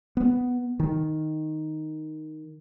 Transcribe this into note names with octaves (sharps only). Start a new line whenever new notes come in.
B3
D#3